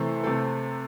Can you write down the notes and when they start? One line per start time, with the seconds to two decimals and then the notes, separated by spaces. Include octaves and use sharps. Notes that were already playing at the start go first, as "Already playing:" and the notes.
Already playing: C3 E3 A3 C4 A4
0.23 C3 A3 C4 A4